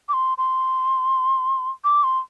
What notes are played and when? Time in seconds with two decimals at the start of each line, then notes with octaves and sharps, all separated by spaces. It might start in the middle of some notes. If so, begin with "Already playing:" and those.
0.09 D6
0.13 C6
0.38 C6
1.84 D6
2.04 C6